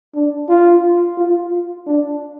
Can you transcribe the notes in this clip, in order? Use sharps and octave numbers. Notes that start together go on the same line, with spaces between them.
D4
F4
F4
D4